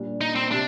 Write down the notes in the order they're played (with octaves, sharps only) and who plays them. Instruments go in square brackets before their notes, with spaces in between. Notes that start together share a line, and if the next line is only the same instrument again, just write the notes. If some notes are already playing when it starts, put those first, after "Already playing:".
Already playing: [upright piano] A#2 G3 D4
[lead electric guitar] D#4
C4
[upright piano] C3 [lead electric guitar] D4